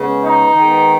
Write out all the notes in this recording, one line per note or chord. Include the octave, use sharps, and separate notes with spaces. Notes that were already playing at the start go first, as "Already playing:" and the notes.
Already playing: C#3 G#3 B3
D#4
D#3 G#3 B3